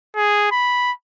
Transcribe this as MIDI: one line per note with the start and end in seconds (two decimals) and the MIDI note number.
0.16 0.51 68
0.52 0.92 83